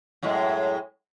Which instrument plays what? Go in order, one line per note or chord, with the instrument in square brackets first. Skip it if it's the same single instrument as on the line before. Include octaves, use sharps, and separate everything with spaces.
[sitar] F#2 A2 G#3